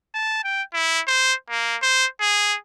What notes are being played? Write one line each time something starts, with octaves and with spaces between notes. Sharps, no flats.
A5
G5
E4
C5
A#3
C5
G#4